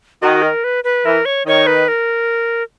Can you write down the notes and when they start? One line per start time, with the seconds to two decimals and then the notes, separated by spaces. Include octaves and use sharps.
0.22 D#3 D#4 F#4
0.42 A#4
0.64 B4
0.84 B4
1.05 E3 E4 A#4
1.25 C#5
1.46 D#3 D#4 C#5
1.67 B4
1.88 A#4